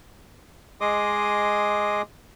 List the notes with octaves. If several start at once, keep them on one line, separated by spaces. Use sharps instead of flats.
G#3 G#4 D#5 C6 D6 D#6